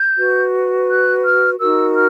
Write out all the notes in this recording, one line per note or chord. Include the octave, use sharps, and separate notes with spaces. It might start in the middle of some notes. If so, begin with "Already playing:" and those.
Already playing: G6
F#4 B4
F#6
F6
D#4 F#4 A#4 E6
F6